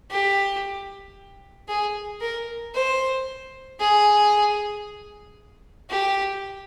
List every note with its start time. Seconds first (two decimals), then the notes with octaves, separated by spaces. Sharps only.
0.10 G4
1.68 G#4
2.21 A#4
2.74 C5
3.80 G#4
5.90 G4